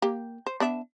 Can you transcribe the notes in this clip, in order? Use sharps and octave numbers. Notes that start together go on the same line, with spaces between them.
A#3 G4
C5
B3 D4 E5